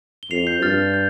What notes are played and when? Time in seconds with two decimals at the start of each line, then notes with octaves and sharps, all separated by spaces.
0.23 G7
0.31 F2 C7 F7
0.47 G6 C7
0.62 G2 F6 A6
0.94 G6